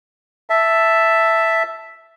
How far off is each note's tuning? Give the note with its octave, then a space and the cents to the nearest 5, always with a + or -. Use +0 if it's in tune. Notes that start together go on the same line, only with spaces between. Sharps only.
E5 +0 A5 +0